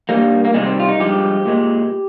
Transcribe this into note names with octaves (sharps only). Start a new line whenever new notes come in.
G2 G3 A#3
A#3
C3 D#3 G3 G#3
C4
F4
D#4
G2 F3 G#3 G4
A#2 G#3